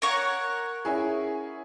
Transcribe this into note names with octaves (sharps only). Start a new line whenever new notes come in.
A#4 C#5 F#5
C#4 E4 G#4